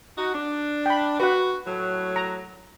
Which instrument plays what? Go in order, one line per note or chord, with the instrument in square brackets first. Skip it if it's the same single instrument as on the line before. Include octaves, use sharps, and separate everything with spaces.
[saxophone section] D#4 F#4
D4
[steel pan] G5 B5
[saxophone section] F#4 [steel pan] B4 F#5
[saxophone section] A2 F#3
[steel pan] A#5